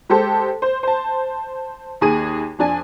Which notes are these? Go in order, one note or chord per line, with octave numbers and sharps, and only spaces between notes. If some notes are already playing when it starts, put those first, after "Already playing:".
G#3 G4 A4 C5
C5
C5 A5
D#2 G#4 D#7
F2 D4 G#5